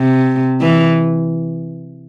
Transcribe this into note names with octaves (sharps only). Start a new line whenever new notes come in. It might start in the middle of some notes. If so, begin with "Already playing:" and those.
Already playing: C3
E3